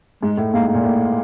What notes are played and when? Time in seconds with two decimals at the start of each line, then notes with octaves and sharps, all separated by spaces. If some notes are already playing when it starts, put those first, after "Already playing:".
0.23 G#2 G#3
0.37 A2
0.54 G#2 A#3
0.68 A#3
0.74 A#2
0.84 A2